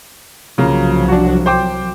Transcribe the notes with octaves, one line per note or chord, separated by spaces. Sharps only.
C2 C#3 F3 F#3 A#3 F4
D4 F#4
C5 G5 D6